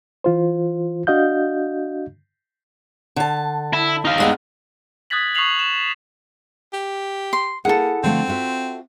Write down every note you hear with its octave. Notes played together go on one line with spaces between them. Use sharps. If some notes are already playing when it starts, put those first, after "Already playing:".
E3 F4 C5
D4 F#4 D#5 F5 G6
D3 A5
E4
D#4 F5
G2 G#3 B3
D#6 F#6 G#6 A6 B6 F#7
C#6 D#6 F#6 C7 F7 F#7
E7
G4
C6
A#3 E4 G#4 A4 F#5
D3 F3 A3 C4
F4 F#4 E5